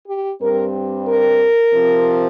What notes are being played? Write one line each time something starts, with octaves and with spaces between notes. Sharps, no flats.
G4
G2 G3 C4 A#4
A#4
C3 F3 C4